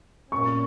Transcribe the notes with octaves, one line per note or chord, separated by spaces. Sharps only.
A#2 A#3 C#4 C#6